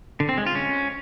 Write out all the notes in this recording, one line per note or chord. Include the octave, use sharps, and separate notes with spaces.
D3
C4
G#3
F4
C#4